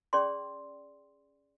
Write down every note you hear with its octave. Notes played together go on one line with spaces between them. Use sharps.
C#4 G#4 D5 G5 C6